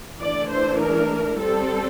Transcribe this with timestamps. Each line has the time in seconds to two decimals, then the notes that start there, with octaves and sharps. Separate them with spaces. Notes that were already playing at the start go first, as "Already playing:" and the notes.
0.19 E3 A3 D4 D5
0.50 C5
0.79 A#4
1.38 G3 C4 A4